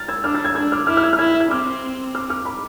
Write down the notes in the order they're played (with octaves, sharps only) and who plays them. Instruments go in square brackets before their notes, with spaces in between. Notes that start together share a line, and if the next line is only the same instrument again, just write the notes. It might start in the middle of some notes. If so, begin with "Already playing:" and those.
Already playing: [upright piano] F6 A6
E6 G#6
[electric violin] D4 [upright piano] D6 F6
[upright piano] F6 A6
E6 G#6
[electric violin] D4 [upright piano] E6 G#6
[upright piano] D6 F6
[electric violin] E4 [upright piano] D6 F6
[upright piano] F6
E6 G#6
F6
[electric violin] E4 [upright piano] E6 G#6
[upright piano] G#6
[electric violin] C4 [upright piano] D6 F6
[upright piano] D6 F6
D6 F6
B5 D6